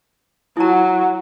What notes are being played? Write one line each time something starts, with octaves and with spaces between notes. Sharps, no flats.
F#3 E4 A#5